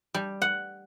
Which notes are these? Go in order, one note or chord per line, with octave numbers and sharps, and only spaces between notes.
G3
F#5